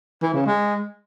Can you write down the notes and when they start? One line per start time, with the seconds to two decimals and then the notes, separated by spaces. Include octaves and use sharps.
0.22 E3
0.34 C#3
0.46 G#3